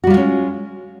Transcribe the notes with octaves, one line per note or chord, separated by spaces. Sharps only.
G3 G#3 C#4 F4 F#4